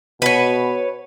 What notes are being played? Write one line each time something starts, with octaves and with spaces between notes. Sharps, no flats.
B2 B4 C#5